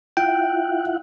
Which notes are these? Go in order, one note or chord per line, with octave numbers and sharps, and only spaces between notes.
E4 F4 F#5 G5